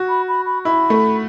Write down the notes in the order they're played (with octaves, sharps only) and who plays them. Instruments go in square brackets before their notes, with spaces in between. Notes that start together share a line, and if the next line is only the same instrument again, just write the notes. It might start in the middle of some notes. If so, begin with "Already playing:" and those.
Already playing: [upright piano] F#4
[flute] B5
B5
B5
[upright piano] E4 [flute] B5
[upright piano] A3